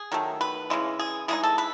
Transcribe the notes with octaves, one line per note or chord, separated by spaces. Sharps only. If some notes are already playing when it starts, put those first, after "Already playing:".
Already playing: G#4
D#3 F#3 A3
B4
C#3 E3 G#3
G#4
E3 G#3 D#4 G#4
A4
B4